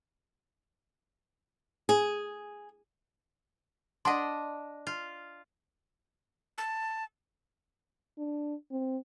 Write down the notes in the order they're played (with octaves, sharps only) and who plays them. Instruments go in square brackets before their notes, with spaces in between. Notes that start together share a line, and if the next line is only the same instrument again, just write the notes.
[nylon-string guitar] G#4
[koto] D4 D#5 [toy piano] D5 F#5 C6
[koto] F4
[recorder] A5
[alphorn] D4
C4